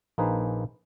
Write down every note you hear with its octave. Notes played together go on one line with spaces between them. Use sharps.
A#1 A#3 D#4 G#4 B4 C5